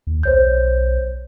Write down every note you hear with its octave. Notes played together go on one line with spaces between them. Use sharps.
D#2
B1 C5 C#5 G6